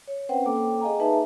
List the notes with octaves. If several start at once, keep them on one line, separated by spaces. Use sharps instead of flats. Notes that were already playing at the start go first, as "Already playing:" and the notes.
C#5
C4 C#4 B4 C5 F#5 G5
A#3 A4 G5 D6
G#4 D#5 F5 G#5 A#5
D#4 G#4 B4 E5 A5